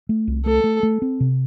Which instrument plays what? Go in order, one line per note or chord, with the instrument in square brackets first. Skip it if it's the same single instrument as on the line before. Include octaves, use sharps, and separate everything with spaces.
[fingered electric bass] A3
C2
[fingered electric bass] A3 [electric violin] A4
[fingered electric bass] A3
A3
C4
C3